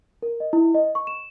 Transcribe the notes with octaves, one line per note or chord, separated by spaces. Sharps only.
A#4
D#5
E4
D#5
C#6
E7